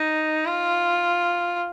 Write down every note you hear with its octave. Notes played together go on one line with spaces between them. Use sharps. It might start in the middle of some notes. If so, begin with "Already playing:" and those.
Already playing: D#4
F4